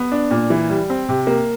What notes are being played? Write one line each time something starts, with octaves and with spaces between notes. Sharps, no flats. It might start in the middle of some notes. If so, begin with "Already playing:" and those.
Already playing: B3
D4
A#2
E3
G3
C4
C3
A#3